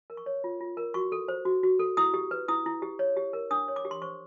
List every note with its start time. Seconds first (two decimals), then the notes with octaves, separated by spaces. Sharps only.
0.10 A#4
0.17 C#6
0.26 C#5
0.44 F4
0.60 F4
0.77 A#4
0.94 F#4 C#6
1.12 A4
1.28 C5
1.45 F#4
1.63 F#4
1.79 A4
1.97 E4 D#6
2.14 G4
2.31 B4
2.48 E4 D#6
2.66 E4
2.82 G4
2.99 C#5
3.17 G4
3.33 A#4
3.51 D4 D#6
3.68 C#5
3.76 D6
3.85 G4
3.91 C6
4.02 C5 C#6